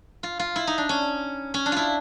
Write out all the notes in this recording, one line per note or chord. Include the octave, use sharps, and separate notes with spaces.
F4
F4
E4
D#4
D4
C#4
C#4
D4
E4 F4